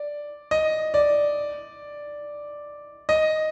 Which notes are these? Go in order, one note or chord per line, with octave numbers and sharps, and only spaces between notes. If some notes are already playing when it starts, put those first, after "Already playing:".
Already playing: D5
D#5
D5
D#5